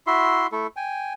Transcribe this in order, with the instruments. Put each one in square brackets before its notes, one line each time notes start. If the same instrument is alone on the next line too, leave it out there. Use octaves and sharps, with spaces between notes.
[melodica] E4 F#4 E5 C6
A3 E4 A4
G5 G#5